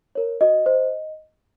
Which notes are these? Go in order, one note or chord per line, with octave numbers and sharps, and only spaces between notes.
A#4 C#5
F#4 D#5
C5